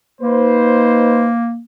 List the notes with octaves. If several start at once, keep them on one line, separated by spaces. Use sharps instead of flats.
A#3 D#4 B4 C5